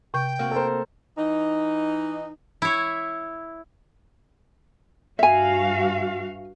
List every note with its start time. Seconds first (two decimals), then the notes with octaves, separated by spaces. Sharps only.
0.14 C3 G5 G6
0.39 A#3 C4 F#4
0.51 A4 A#4 C5
1.18 E3 D#4
2.62 E4 C#5
5.19 G2 F#4 E5 F5 G#5